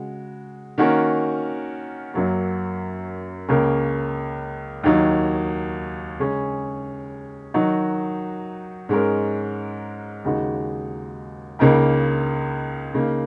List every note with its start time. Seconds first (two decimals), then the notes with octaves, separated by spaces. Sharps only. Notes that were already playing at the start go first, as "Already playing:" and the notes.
Already playing: C#3 G#3 F#4
0.78 D#3 A#3 C#4 F#4 A#4
2.14 F#2 F#3 A#3
3.49 C#2 C#3 A#3 C#4 A#4
4.83 D#2 D#3 F#3 D#4
6.19 C#3 G#3 C#4 G#4
7.54 D#3 F#3 D#4 F#4
8.89 G#2 G#3 C#4 A#4
10.24 D#2 C#3 G#3 D#4 F#4
11.59 C#2 C#3 A#3 D#4 A#4
12.94 C#3 A#3 D#4